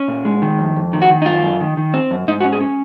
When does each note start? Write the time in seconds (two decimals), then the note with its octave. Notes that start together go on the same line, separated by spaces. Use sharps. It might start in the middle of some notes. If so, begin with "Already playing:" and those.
Already playing: C#4
0.08 A#2
0.25 G#3
0.42 D#3
0.59 F2
0.76 F2
0.93 D#3
1.02 F#4
1.10 D#3
1.22 D#4
1.26 F#2 F4
1.43 F#2
1.60 D#3
1.77 D#3
1.94 C4
2.11 F#2
2.28 G#2 D#4
2.40 F#4
2.45 C#4
2.53 G#4
2.61 C#4